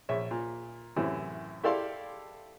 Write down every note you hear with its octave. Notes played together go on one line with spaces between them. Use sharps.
A#1 C#5 E5
A#2
F#2 A2 C3 E3
E4 G4 A4 D5 F5 C6